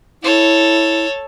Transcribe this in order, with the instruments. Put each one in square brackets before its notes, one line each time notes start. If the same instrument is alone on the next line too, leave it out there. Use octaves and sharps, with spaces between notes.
[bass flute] E4 [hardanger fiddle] A4 C#5